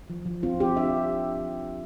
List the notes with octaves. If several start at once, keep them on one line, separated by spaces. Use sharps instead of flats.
F3
F3
C4 F4
C4 G4
D4 E5